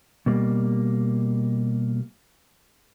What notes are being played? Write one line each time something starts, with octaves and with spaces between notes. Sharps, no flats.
B2 G3 A#3